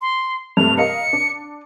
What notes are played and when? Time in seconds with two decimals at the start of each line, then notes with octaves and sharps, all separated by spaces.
0.01 C6
0.57 G2 C3 A3 F7
0.78 A#4 D#5 F5 C#7
1.13 D4